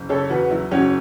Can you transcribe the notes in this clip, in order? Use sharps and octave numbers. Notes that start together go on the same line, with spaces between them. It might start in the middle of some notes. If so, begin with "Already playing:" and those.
Already playing: F#1
C#3 A4 C#5
E2 F#4 B4
F#3 E4
F#1 C#4 F#4